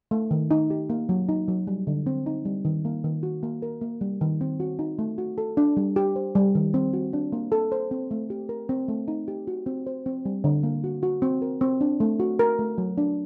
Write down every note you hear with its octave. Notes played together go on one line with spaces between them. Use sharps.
A3
D#3
D#4
G4
A#3
F#3
D#4
F#3
G3
D3
C4
D#4
G3
D#3
A#3
D#3
F#4
A#3
A#4
A#3
G3
D#3
C4
F#4
D#4
A3
F#4
A4
D4
G3
G4
C5
G3
D#3
C4
F#4
D4
A#3
A4
C5
C4
A3
G4
A#4
C4
A3
D#4
G4
F#4
C4
C5
C4
G3
D3
A#3
F#4
F#4
C4
A#4
C4
D4
A3
F#4
A#4
A3
F#3
D4